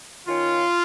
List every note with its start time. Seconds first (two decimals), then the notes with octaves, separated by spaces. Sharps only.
0.27 D#3 C#4 F4